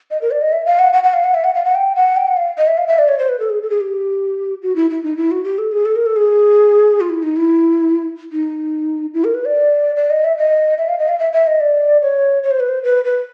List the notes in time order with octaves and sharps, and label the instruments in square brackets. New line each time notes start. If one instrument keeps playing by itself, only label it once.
[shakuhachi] D#5
A#4
D5
D#5
E5
F5
F#5
F#5
F#5
F5
F#5
E5
F#5
F5
F#5
G5
F#5
G5
F#5
F5
D#5
E5
F5
E5
D5
C#5
C5
B4
A4
G#4
A4
G#4
G4
F#4
E4
E4
D#4
E4
F#4
G4
A4
G#4
A4
A#4
A4
G#4
F4
E4
D#4
E4
D#4
E4
A#4
B4
D5
D5
D#5
E5
D#5
E5
F5
D#5
F5
E5
E5
D#5
D5
C#5
C#5
C5
B4
C5
B4
B4